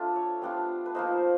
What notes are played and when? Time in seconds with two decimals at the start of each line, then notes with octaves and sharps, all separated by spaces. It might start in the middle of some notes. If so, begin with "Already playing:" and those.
Already playing: A3 D4 F4
0.16 C#5
0.42 G3 B3 D4 F4
0.86 B4
0.95 F3 A#3 D#4 C5